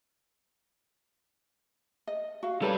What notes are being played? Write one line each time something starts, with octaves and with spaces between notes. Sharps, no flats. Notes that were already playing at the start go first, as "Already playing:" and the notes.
D#5
F#4 F5
G3 A4 B4 C#5 B5